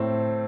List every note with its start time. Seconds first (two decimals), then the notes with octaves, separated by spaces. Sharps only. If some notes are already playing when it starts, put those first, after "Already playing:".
Already playing: A2 C4